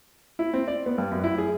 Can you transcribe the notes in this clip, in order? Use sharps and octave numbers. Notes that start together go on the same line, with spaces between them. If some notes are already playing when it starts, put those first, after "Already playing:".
E4
C4
D5
B3
G2
F#2
E4
G#4